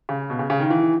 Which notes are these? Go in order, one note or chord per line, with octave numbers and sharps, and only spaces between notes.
C#3
B2
C#3
C#3
D#3
E3